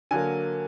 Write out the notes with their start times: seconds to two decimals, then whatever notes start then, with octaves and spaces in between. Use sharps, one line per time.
0.11 D3 F#3 A#3 G#5